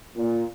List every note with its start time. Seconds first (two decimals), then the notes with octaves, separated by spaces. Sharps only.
0.15 A#2